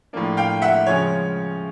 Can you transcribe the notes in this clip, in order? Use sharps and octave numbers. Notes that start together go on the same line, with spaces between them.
A2 F3 A#3 D4
F5 G5
E5 F#5
C#3 F3 G#3 C#4 C#5